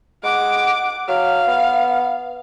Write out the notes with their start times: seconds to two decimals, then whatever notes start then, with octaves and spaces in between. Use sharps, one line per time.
0.23 G#3 F#5 D6
1.08 F#3 F5
1.48 B3